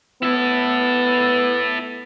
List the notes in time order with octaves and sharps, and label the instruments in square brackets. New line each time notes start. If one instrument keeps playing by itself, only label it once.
[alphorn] B3 [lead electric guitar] E4 A4